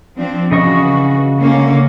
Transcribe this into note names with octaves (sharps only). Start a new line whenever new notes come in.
F3 C4 D4
C#3 E3 F#4 D#5 C#6
D3 A#3 C#4